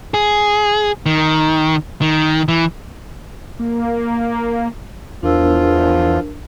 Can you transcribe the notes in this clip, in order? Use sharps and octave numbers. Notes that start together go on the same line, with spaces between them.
G#4
D#3
D#3
E3
A#3
E2 F3 D4 F4 A#4 E6